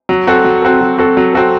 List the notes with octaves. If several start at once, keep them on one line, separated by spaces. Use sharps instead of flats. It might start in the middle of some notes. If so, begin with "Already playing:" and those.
F#3
C4 F#4 A4
F#3
C4 F#4 A4
F#3
C4 F#4 A4
F#3
C4 F#4 A4